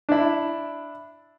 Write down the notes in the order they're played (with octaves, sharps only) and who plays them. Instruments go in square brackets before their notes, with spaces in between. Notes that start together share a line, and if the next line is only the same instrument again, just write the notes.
[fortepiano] D4 E4